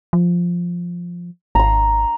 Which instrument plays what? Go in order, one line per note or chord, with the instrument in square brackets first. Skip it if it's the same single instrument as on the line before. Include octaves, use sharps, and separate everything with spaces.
[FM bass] F3
[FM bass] G#1 [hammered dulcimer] A#5 C6